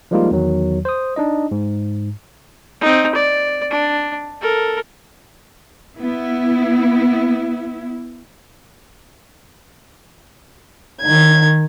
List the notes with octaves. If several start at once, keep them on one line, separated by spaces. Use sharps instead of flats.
F3 G3 G#3 A#3 D#4 F4
E2 D#3 F#3
C5 D#6
D4 D#4 D#5
G#2
C4 D#4
D5
D4
A4 A#4
B3 E4
D#3 G#6